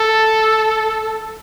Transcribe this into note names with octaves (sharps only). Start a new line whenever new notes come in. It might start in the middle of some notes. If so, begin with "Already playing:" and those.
Already playing: A4